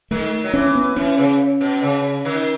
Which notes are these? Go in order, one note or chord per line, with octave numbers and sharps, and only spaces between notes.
D#3 A3
F#3
E3 C#4
B3
E3 C#4
C#3
B2
C#3
D#3